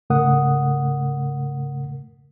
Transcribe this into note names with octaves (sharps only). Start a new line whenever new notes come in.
G#2 C#3 A3 A#4 F#5 D#6